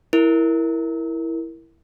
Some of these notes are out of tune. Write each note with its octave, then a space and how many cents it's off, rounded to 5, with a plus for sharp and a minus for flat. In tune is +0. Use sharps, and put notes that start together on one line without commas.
E4 +0 A#4 +0